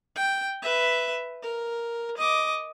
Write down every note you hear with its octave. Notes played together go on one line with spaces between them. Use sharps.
G5
B4 E5
A#4
D#5 D6